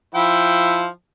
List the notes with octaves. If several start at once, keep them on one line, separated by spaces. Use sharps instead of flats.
F3 E4 G5